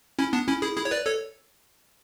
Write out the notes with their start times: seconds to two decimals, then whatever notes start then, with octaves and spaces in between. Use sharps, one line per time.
0.19 C#4 E4
0.33 B3 D4
0.47 C#4 E4
0.62 E4 G#4
0.76 E4 G#4
0.85 C#5
0.91 B4 D5
1.05 A4 C#5